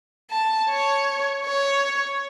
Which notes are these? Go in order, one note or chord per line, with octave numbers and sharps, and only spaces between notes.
A5
C#5
C#5